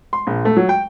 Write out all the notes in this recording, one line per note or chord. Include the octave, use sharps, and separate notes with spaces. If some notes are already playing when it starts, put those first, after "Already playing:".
C6
A#1
A3
F#3
G5